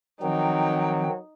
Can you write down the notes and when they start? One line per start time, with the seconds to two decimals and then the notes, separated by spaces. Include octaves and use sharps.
0.22 D#3 F3 F#3 C4 D#4 G5